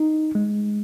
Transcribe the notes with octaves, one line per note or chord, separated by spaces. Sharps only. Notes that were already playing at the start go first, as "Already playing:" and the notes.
Already playing: D#4
G#3